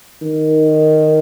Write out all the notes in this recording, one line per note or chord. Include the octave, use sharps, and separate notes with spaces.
D#3